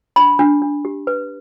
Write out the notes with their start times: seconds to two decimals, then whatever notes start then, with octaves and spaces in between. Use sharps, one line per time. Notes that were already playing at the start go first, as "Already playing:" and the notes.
0.16 D4 B5
0.39 D4
0.62 D4
0.85 G4
1.07 B4